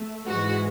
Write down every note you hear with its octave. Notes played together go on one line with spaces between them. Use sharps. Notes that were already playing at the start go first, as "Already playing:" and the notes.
Already playing: A3
G#2 E3 G#3 F#4